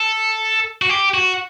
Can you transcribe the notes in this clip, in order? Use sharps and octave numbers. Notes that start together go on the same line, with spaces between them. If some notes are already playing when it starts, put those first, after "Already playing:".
Already playing: A4
F#4
G4
F#4